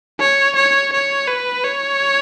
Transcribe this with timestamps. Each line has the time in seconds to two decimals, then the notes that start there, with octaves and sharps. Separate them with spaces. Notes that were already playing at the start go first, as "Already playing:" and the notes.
0.20 C#5
0.56 C#5
0.93 C#5
1.28 B4
1.64 C#5